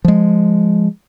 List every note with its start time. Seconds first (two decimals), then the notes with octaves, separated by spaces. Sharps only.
0.05 F3 G#3